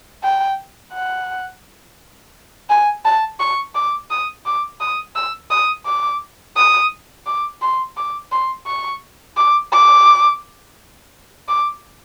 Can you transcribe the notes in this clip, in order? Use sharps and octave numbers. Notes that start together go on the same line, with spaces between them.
G5
F#5
G#5
A5
C#6
D6
D#6
D6
D#6
E6
D#6
D6
D#6
D6
C6
D6
C6
C#6
D6
D6
D6